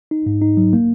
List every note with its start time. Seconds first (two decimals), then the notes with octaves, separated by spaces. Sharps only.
0.11 D#4
0.26 G#2
0.41 D#4
0.57 F#3
0.73 A#3